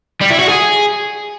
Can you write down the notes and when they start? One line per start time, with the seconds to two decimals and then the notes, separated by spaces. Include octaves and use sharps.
0.21 G3
0.31 E4
0.40 F#4
0.49 G#4